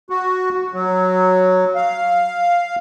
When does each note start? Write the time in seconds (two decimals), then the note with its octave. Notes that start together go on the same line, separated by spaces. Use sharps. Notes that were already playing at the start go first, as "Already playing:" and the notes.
0.10 F#4
0.74 F#3
1.75 F5